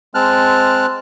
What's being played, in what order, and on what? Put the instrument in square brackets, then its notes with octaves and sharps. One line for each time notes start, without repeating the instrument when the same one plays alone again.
[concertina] G#3 C4 A5 F6 F#6